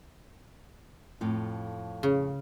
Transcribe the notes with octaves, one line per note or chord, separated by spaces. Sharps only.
F2 A2 F4
C#3